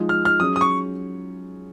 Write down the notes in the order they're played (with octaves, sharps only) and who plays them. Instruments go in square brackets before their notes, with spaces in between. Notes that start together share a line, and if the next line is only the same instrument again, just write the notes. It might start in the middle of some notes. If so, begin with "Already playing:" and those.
Already playing: [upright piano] F3 G#3 D#4
[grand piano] F6
F6
[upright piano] F#3 C#4 G#4 [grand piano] D#6
[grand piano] D#6
C#6